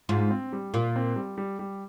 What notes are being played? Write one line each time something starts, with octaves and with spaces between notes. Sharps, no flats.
G#2 F4
C4
G3
A#2 F4
C4
G3
G3
G3